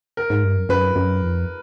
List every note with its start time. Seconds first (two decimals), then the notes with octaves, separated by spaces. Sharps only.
0.17 A#4
0.30 G#2
0.44 G2
0.57 F#2
0.69 F#2 B4
0.96 F#2
1.22 F2